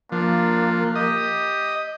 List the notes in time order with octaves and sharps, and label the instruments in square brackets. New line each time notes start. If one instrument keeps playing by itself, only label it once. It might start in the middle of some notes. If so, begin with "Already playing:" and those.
[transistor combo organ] F3 [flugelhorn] A#3 [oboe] D4
[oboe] G4 [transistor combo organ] D#5